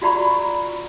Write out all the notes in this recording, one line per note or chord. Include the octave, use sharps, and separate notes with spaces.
F4 F#4 D5 A#5 B5 C#6